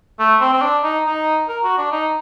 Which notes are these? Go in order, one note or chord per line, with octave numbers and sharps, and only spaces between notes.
A3
C4
C4
D4
D#4
D#4
A#4
F#4
D4
D#4